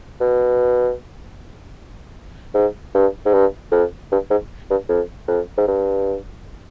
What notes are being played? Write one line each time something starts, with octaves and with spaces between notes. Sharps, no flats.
B2
G#2
G2
G#2
G2
F2
G2
G#2
G2
F2
F2
G#2
G2